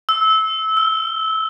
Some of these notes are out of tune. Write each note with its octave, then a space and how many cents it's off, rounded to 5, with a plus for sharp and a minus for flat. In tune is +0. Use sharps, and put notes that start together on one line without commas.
E6 -20
E6 +30